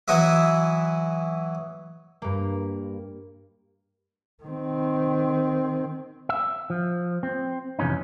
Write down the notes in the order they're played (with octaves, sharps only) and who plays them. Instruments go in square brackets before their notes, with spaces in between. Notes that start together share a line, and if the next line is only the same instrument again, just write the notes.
[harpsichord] E3 F#3 F#4 D#5 E5
[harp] G2 A#3
[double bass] D#3 C4
[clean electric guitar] E5
F3
C4
F2 C3 E3 C#4 D#4